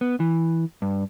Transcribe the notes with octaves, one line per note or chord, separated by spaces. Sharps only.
B3
E3
G2